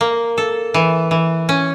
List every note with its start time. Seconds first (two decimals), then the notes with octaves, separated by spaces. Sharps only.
0.01 A#3
0.38 A4
0.74 E3
1.11 E3
1.49 C#4